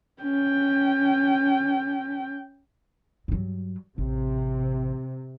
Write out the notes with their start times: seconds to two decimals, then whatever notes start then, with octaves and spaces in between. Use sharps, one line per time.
0.23 C#4 G5
3.28 G2 F#3
3.98 A1 C3